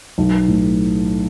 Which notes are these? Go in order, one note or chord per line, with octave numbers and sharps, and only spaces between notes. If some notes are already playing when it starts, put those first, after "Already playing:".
B1
A2